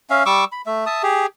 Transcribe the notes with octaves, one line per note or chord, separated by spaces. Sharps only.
C#4 E5 F5
G3 C#6 D6 E6
B5
A3 E5
E5 A5 D#6
G4 G#4